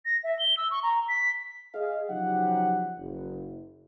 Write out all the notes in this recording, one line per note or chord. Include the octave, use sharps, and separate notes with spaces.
A#6
E5
G7
E6
C#6
A#5
B6
G#4 D#5 F5
C#3 F3 F#3 D#4 G4 F#5
F#1